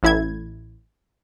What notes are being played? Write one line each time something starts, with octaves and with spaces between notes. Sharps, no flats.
A1 E4 G#6